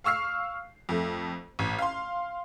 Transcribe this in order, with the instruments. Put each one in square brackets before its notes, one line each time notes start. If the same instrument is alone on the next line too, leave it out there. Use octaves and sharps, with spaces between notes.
[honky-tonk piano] F5 C#6 E6 F6 C7
F2 A3
A1
F5 C6